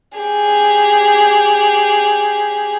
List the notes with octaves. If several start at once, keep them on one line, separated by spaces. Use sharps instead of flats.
G4 G#4